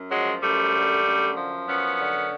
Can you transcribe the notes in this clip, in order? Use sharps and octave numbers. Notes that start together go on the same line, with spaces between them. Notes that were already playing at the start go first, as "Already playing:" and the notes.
Already playing: F#2
F3 F#3 G#3
F#2 G3 A3
D3
F#2
F3
F#2 B3 C#4
D3